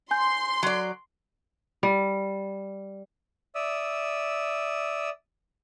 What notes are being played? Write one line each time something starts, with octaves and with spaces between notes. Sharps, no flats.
G#5 C6 G6
F#3 D5
G3
D5 E5 D#6 E6